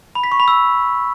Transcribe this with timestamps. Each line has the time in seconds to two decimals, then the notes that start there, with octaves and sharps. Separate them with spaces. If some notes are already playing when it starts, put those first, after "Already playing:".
0.15 B5
0.24 B6
0.32 C#6
0.40 B5
0.48 E6